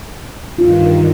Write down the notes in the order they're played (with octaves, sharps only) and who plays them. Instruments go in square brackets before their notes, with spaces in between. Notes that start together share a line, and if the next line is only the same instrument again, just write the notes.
[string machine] G2 D#3 [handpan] F4